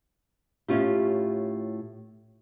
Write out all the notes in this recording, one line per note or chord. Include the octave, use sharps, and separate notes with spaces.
A2 C#4 F4 G4